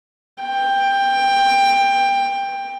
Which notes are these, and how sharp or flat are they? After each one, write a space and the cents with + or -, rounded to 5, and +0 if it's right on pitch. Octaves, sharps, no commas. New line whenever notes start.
G5 +15